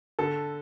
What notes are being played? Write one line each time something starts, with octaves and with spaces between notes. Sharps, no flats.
D3 A4